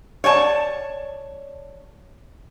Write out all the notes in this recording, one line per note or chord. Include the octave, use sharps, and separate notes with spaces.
C#5 D5 G5 A5